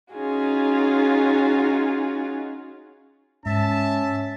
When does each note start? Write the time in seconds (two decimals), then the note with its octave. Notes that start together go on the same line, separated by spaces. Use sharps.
0.12 C#4 D#4 F4 F#4 G#4
3.46 G#2 C#4 E5 A5